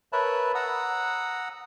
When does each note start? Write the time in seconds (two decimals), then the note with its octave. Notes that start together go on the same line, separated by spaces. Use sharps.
0.13 A#4 B4 C#5 E5 A5 B5
0.55 F#5 A#5 D#6 E6